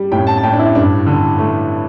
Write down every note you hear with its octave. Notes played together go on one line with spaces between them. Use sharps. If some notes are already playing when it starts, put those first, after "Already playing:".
Already playing: G3
A2 G5
A5
A5
A2 G5
D4
E4
G2 D4
D3
A3